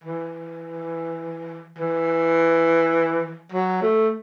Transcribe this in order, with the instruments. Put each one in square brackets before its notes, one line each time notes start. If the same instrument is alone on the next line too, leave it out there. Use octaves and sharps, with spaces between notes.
[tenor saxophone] E3
E3
F#3
A3